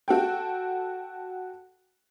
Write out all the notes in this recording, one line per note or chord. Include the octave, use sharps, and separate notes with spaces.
F#4 A4 G5